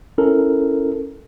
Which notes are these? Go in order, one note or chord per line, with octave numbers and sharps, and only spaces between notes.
C#4 E4 A4 A#4